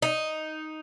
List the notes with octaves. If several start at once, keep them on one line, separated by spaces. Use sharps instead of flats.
D#4